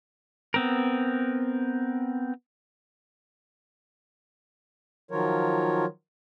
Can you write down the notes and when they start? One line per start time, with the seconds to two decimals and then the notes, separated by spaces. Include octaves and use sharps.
0.54 B3 C4 A#4
5.11 D#3 F3 F#3 F4 A#4 C#5